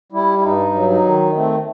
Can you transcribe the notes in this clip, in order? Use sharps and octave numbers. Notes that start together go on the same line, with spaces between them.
G3 E4
E4
G2 D#4
F#3
D#4
D#3
A3 C4